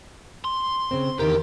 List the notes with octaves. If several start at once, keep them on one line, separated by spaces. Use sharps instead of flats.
C6
C#3 C4
E2 D#3 G4 A#4